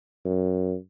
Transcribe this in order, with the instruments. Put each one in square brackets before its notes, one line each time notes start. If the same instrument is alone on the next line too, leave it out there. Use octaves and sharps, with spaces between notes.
[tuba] F#2